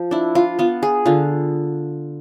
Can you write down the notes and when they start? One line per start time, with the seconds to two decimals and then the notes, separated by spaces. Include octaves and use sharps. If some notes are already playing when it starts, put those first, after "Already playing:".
Already playing: F3
0.11 D4 E4
0.35 F4
0.59 B3 F4
0.83 G#4
1.06 D3 F4